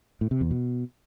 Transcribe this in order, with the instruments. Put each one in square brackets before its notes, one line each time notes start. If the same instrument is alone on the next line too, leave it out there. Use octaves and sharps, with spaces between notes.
[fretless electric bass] A2
C3
E2
B2